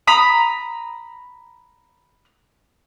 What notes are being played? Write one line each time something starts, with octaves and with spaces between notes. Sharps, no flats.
A#5 B5 D#6